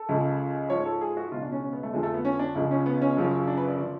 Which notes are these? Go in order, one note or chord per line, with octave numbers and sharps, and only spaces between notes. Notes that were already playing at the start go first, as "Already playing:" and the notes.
Already playing: A4
C#2 C#3 F3
G#2 F3 C#5
A4
G#4
F#4
C#2 B2 F4
D4
C#4
C#4
B3
A3
F2 D3 F3 G#3
A3
B3
C#4
D4
C#2 C#3 F3
C#4
B3
C#4
F#2 C#3 F3
D4
B4
D5
D3 F3 D5